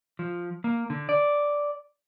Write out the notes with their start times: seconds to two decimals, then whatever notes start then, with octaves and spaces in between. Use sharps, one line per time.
0.19 F3
0.64 A#3
0.90 D3
1.09 D5